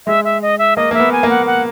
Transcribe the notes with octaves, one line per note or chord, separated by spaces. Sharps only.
G#3 E5
E5
D#5
E5
A#3 D#5
A#3 E5
B3
G#5
A#3
F#5
F#5